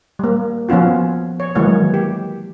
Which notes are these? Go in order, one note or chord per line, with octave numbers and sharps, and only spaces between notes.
G3 A#3
F3 B3 C#4 F4 F#4
C#5
D#3 E3 F#3 G#3 A#3 C#5
G4